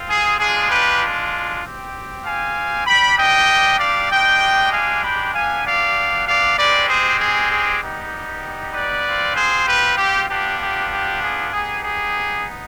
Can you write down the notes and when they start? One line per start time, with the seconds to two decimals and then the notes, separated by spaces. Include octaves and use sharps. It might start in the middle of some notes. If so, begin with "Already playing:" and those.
Already playing: C4 F4
0.09 G#4
0.39 G#3 D4 F4 G#4
0.71 G4 B4
1.63 C4 G4
2.25 F5 G#5
2.87 G3 D4 G4 G5 B5
3.18 D#5 G5
3.80 D5 F5
4.11 G#3 D4 G4 D#5 G5
4.73 F5 G#5
5.04 G5 B5
5.34 B3 D4 G4 F5 G#5
5.66 D5 F5
6.28 D5 F5
6.58 G#3 C4 G4 B4 D5
6.89 G#4 C5
7.20 G#4
7.51 G#4
7.82 G3 B3 D#4 G4
8.74 B4 D5
9.06 C4 F4
9.36 G#4 C5
9.67 G4 B4
9.98 G4
10.29 B3 D4 F4 G4
10.60 G4
10.91 G4
11.22 G#4
11.53 B3 D#4 G4 G#4
11.84 G#4